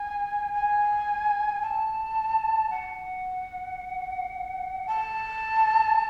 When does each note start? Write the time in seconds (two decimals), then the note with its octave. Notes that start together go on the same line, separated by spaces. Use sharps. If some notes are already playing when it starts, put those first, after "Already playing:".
Already playing: G#5
0.53 G#5
1.62 A5
2.70 F#5
4.87 A5